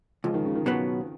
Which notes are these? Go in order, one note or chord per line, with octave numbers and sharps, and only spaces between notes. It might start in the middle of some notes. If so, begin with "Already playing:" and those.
C#2 F3
D#3
C#3
D#3
B2 F#3 B3